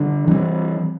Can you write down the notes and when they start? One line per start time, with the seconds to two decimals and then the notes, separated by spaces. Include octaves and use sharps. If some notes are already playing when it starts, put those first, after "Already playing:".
Already playing: D3 G3 D4
0.27 E3 G3 C4